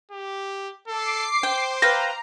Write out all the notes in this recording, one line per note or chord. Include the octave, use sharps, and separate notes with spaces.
G4
A4 D6 C7
C5 G5
B4 F5 G5 A#5 A#6